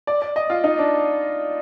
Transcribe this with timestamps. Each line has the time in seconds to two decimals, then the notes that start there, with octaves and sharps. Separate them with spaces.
0.07 D5
0.22 D5
0.36 D#5
0.50 F4
0.64 D#4
0.78 D4